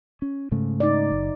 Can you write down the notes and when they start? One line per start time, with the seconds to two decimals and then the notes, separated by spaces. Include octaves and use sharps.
0.22 C#4
0.51 G#2 C#3 A3
0.80 D#4 D5
1.12 F#1